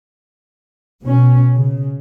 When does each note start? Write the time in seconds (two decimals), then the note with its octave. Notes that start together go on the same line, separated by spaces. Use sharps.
1.04 B2 C#4
1.57 C#3